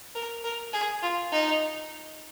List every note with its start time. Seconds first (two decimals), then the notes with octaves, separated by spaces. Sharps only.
0.15 A#4
0.44 A#4
0.73 G#4
1.02 F4
1.31 D#4